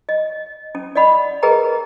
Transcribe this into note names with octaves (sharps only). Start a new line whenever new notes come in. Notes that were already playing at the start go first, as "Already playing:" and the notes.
D#5
C#4
D5 D#5 F#5 B5
G#4 A#4 B4 D#5 G5 A#5